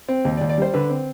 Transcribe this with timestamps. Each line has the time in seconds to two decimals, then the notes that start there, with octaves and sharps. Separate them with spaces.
0.09 C4
0.25 D#2
0.37 D5
0.41 D#2
0.49 D5
0.58 G3 C5
0.74 D3 B4
0.90 C4